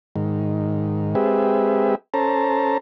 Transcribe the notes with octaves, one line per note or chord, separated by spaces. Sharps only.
G#2 D#3
G#3 C4 G4 G#4 B4 E5
C#4 A4 C5 A5 A#5